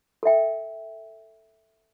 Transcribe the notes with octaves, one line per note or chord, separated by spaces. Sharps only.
A4 E5 G5